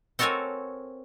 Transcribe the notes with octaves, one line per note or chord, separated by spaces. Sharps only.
C4 F#4 A4 A#4 C#5 G#5